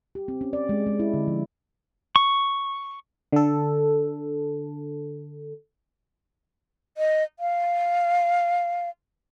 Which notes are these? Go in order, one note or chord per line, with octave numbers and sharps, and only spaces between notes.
G4
C4
C#4
D5
G#3
G#3
E4
D3
F3
C#6
D3 A4
D#5
F5